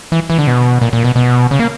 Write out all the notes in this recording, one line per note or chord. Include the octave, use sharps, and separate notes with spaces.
E3
E3
D3
B2
A#2
A#2
B2
B2
C#3
A#3